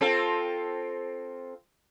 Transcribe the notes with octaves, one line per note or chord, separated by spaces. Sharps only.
C4 F4 A4